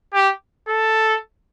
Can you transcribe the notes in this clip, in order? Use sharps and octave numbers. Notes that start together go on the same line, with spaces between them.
G4
A4